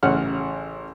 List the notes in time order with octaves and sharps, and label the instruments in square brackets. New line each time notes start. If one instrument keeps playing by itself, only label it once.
[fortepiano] A1 C#3 F#5 F6